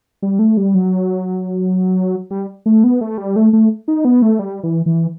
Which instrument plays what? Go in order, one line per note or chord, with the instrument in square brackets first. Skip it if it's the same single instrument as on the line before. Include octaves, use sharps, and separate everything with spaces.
[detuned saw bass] G3
A3
G3
F#3
G3
A3
B3
A3
G3
A3
A3
D#4
B3
A3
G3
E3
E3